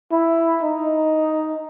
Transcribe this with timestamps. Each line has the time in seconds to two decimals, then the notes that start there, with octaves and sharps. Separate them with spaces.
0.12 E4
0.63 D#4